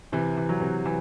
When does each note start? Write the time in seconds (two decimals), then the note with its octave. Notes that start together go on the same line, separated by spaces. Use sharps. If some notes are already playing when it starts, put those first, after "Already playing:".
0.12 C3 E3
0.37 E3
0.49 F#3
0.61 C3
0.85 E3